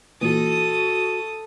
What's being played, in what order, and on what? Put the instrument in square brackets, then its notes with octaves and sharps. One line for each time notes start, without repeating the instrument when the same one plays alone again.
[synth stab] A#2 E3 [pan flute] F#4 [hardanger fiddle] A4 D#6